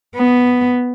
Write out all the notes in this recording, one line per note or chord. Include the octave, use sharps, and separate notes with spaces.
B3